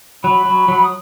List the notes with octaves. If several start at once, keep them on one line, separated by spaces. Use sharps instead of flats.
F#3 B5
F#3
F#3
D#6